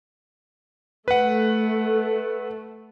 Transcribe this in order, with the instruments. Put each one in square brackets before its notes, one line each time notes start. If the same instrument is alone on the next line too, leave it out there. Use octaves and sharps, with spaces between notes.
[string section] A3 [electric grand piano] B4 F#5